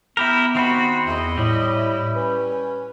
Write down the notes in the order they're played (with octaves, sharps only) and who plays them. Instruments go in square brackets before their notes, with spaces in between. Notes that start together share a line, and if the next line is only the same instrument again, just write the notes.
[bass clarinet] B3 [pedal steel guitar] E4 G4 A#4 [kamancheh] B5
[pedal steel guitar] D#3 C4 F#4 [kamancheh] B5
[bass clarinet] E2 [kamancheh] E4 D#5
[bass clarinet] A2 [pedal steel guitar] G3
[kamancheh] E4
[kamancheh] C#4 [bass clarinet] B4